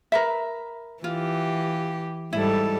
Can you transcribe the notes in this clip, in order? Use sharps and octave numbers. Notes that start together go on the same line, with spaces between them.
A#4 B4 E5
E3 F4 G4
G#2 G3 E4 A4